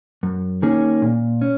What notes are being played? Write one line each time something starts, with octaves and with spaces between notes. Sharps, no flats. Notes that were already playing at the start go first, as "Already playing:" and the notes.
F#2
D#3 A#3 C#4 G#4
A#2
C#4